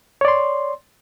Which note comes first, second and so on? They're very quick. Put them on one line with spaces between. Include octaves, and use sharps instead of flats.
C#5 D5 C6